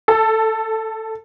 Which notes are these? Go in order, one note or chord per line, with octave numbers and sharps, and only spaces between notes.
A4